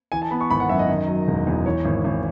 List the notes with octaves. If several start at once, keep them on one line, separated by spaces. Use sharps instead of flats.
E3 G#5
A5
B3 B5
C#6
G#1 B5
F#5
F#2 E5
D#5
D#3
F#3
E1
E2
E3 C#5
G#1
G#1